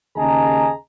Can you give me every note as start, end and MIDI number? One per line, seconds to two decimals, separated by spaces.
0.17 0.71 39
0.17 0.71 49
0.17 0.71 68
0.17 0.71 75
0.17 0.71 81
0.17 0.71 82